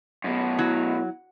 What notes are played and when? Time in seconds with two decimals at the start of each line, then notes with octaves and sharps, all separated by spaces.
0.24 F#2 B2
0.59 F#3 E4